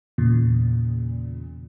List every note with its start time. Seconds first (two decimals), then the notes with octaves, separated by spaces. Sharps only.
0.18 E2 A#2 C#3